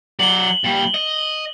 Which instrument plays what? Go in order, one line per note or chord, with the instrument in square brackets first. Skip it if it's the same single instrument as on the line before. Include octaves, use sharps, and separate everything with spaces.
[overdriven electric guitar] F#3 D5 [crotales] F#7 G7
[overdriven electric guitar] A#2 G3
D#5